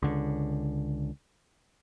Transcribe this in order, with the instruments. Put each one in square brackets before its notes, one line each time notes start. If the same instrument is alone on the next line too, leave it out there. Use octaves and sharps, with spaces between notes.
[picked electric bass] C#2 D3